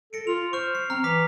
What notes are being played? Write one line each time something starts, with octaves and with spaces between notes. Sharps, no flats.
A4 A#6 C#7 D7
F4 F7
C5 C#6 F6
C7
C4 A#5 F6
E3 A#5 D6 B6